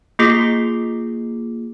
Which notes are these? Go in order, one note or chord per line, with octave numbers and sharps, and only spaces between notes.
A#3 F4 G#4 D6 C7